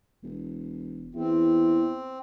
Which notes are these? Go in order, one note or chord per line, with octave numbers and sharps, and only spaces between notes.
E1
E2 C4 E4